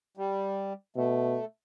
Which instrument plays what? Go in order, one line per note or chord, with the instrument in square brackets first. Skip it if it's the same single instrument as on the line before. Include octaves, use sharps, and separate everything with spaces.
[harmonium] G3
[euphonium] B2 [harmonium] A3